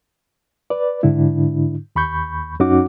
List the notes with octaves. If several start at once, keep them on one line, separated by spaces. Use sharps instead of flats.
B4 D5
G#2 D3 D4 E4
D#2 B5 C#6 G6
F#2 C#4 D#4 F#4 F#5 D6